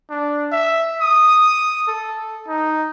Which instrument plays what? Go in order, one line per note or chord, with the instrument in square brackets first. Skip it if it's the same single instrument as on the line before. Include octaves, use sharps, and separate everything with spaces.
[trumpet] D4
E5
D#6
A4
D#4